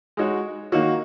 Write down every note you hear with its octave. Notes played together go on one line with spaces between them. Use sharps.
G#3 D#4 F#4 C#5
D#3 A#3 D#4 F#4 C#5